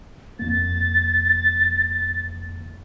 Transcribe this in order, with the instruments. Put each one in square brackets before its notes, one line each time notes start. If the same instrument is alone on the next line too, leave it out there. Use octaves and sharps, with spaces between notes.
[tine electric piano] F2 A#3 [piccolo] A6